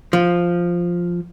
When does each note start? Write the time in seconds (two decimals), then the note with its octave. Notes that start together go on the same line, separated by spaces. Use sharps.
0.13 F3